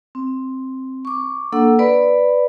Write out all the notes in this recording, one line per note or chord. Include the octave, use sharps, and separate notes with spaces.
C4
C#6 D6
A#3 D4 A4 F#5 E6
B4 D5 B5